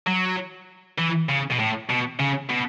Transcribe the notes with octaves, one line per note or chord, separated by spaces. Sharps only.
F#3
E3
C#3
B2
A2
B2
C#3
B2